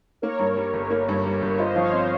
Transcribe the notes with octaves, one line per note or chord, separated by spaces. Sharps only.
A#3 A#4 C#5
G2
G3
G1
A#3
G2
G3
G1
F4 C5 D#5
F3 C#5 F5
C4 C5 D#5